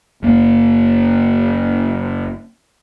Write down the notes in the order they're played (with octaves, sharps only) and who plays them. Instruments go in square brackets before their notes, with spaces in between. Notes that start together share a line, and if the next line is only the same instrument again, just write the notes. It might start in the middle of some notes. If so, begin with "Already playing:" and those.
[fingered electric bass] F#1 A#3